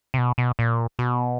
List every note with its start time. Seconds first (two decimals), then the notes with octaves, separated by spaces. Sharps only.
0.14 C3
0.18 B2
0.38 B2
0.59 A#2
0.99 B2